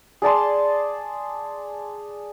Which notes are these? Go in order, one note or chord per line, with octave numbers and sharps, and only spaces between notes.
G#4 D5 A5 C6